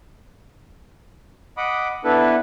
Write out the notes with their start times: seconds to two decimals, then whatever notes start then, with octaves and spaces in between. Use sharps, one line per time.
1.57 D#5 F#5 B5 D6 D#6
2.04 B3 D4 E4 A4 B4